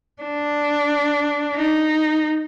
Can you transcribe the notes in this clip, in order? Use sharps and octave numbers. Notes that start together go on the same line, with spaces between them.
D4
D#4